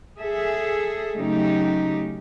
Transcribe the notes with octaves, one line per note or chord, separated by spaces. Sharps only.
G#4 A4 E5
C#3 F#3 A3 C#4 D#4 G4